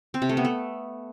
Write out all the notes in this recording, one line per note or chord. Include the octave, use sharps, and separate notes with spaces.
C4
C3
A3
B3
A3